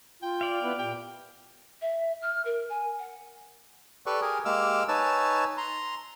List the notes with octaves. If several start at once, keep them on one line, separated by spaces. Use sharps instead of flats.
F4 G5
D5 F5
B3 E4 B4
A#2 G4 G5
E5
F6
A#4
G#5
F#5
G4 A4 B4 D5 C#6
G4 G#4 A#4 G#5
G#3 A#3 G4 D6 E6 F6
D#4 B4 C#5 G#5 A5 E6
A#5 C6